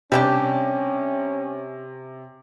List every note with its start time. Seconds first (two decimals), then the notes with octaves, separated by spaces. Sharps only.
0.12 C3 G3 C#4 D4 G4